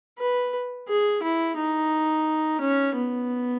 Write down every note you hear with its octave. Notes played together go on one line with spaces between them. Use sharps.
B4
G#4
E4
D#4
C#4
B3